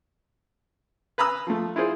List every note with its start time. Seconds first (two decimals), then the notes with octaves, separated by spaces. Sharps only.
1.18 B4 A#5 B5 D#6 E6
1.47 F3 A3
1.76 E4 F4 G#4 C5